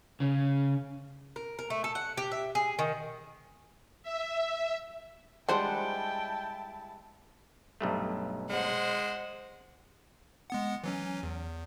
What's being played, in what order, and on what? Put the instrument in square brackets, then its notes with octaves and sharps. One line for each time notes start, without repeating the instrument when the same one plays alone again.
[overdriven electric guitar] C#3
[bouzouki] A#4
A#4
A3
A4
F#5
G4
E5
G#4
D#3
[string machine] E5
[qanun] G3 G#3 F#5 [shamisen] D4 C5 [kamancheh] E4 A5 [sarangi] G5
[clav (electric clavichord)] B1 G2 A3
[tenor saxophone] G#3 [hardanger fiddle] C5 F#5
[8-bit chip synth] G#3 B3 F#5
E3 F#3 C#4
E2